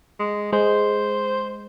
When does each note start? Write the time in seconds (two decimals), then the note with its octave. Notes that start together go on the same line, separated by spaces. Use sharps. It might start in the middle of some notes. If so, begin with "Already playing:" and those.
0.19 G#3
0.53 G#3 C5